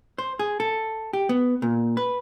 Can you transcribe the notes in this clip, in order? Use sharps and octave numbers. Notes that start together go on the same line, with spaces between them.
C5
G#4
A4
G4
B3
A#2
B4